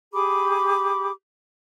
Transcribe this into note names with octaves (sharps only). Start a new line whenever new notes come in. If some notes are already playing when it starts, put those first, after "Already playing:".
G4 G#4 B5 D6